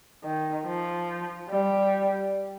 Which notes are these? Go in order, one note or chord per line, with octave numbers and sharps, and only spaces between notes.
D#3
F3
G3